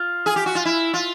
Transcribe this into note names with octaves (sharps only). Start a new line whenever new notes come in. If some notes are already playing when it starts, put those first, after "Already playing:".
Already playing: F4
G#4
G4
F#4
F4
E4
F4